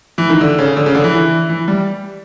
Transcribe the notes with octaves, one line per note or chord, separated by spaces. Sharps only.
E3
D#3
D3
C#3
D3
C#3
D3
E3
E3
G3